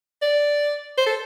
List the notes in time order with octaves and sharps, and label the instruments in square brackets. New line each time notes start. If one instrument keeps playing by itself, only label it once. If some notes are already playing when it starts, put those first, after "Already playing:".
[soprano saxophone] D5
C5
A4